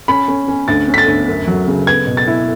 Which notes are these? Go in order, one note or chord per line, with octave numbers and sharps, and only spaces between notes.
C#4 B5
C#4
C#4
D2 A6
C#4
B6
A6
D2
F#2
F#3
C#3
B3 G#6
B2
A6
E4